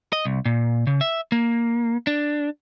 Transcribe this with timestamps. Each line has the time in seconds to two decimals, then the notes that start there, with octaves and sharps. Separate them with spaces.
0.13 D#5
0.25 C2
0.45 A#2
0.87 C#3
1.01 E5
1.32 A#3
2.07 D4